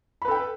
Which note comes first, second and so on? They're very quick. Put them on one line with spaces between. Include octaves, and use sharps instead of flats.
B5 B4 A4 G5